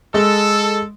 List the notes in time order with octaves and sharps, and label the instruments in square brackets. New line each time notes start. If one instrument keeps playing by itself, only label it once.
[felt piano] G#3 [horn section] A4